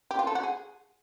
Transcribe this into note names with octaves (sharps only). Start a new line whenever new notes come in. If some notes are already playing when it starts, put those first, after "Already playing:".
G4
F4
A4
F#4
G#4